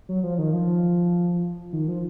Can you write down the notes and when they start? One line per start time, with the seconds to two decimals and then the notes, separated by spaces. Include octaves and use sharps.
0.09 F#3
0.23 F3
0.38 D#3
0.53 F3
1.73 D#3
1.88 F3